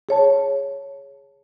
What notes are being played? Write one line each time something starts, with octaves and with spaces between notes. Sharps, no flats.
G#4 C#5 A5